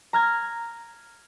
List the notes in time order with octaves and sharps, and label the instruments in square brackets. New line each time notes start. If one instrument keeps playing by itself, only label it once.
[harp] A#5 F6 G#6